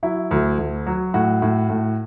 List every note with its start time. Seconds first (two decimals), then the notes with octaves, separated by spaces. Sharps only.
0.03 F#3 E4
0.31 D2
0.58 D2
0.86 F#3
1.14 A2 F#4
1.42 A2
1.70 A2